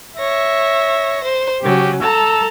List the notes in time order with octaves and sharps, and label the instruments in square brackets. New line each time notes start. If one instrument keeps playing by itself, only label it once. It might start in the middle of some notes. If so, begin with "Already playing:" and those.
[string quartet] C#5 A#6 [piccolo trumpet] E5
[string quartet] C5
[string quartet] C#3 F#3 C#4 [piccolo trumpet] G4
[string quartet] A4 A5 A#5 [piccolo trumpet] E6